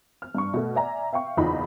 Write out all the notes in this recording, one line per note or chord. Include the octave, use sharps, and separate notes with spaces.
F6
G2 C#6
B2 A3
D5 E5 G#5 A#5
E5 F5 G5 C#6
F#1 E2 D#4 F4 D#5 B5